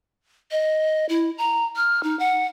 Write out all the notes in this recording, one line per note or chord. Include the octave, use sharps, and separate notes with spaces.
D#5
E4
A#5
F6
D#4
F#5